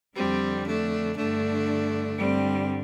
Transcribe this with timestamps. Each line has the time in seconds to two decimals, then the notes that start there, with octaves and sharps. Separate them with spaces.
0.16 F2 D3 G3 C4
0.66 A3 D4
1.17 G2 D3 A3 D4
2.17 G2 D3 G3 C4